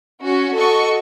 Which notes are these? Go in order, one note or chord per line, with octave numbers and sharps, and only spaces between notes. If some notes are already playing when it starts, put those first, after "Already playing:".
C#4 F#4
F#4 A4 D#5 C#6